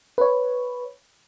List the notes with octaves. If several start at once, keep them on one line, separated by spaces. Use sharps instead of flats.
B4 C#5